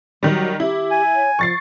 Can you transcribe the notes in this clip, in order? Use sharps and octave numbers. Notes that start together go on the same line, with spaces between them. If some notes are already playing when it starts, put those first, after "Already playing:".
D#3 F#3 G3
E4 G4
G#5
C#5
F3 C#6 A6 C7